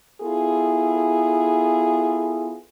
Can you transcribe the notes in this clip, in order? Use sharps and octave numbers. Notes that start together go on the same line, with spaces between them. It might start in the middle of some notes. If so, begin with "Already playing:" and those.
B3 E4 F4 G#4 A4